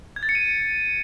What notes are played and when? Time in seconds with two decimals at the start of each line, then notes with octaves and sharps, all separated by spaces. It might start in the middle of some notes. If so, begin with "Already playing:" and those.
0.16 G#6
0.23 A6
0.29 C#7
0.35 D#7